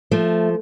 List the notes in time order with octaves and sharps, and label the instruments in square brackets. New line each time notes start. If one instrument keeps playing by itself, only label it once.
[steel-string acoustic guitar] F3 A3